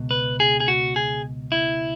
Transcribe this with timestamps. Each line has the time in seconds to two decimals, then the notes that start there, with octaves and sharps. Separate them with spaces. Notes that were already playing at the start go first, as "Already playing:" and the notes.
Already playing: C#2 B2
0.11 B4
0.40 G#4
0.60 G#4
0.68 F#4
0.96 G#4
1.52 E4